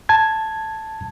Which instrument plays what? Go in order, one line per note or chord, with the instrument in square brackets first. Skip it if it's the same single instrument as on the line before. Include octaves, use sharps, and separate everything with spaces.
[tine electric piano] A5 G#6